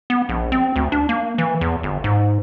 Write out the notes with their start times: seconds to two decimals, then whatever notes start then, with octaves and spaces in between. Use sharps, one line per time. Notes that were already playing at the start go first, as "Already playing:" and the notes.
0.10 B3
0.29 A#1
0.52 C4
0.76 D2
0.92 D4
1.09 A#3
1.38 E3
1.61 E2
1.83 G1
2.04 G#2